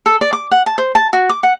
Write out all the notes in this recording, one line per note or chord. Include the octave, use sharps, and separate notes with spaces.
A4
D5
D6
F#5
A5
C5
A5
F#4
D6
F#5